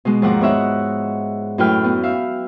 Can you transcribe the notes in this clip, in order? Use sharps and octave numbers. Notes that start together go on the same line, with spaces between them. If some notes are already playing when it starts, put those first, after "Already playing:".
B2 G#3
D#2 G#2 F3 F#5 A#5 D6
B3 D#4 C#5 E5 F#5
F#2 A2 E4 B4 G5 F6
B3
E5 F5